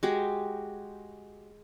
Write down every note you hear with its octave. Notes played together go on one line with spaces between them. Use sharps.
G#3 F#4 G4 G5